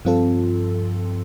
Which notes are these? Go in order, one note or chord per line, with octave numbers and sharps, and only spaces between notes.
G2 F3 C4 F4 A4